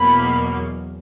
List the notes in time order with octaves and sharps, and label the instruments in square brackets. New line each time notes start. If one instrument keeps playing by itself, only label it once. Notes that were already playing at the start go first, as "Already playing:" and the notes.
Already playing: [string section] E2 B2 F#3 A#3 B5